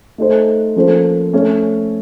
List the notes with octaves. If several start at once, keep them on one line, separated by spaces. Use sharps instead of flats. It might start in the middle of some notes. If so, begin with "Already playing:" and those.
A3 D#4 A4 C5
F3 A#3 C#4 A4 C5
A3 C#4 A4 C#5